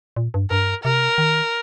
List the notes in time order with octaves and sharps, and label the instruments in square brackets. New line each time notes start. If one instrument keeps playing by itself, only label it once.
[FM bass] A#2
G2
[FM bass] G2 [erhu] A#4
[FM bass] C3 [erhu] A#4
[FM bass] D#3